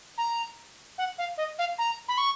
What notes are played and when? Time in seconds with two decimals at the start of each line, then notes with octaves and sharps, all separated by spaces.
0.18 A#5
0.98 F#5
1.18 F5
1.37 D#5
1.59 F5
1.78 A#5
2.08 B5
2.18 C#6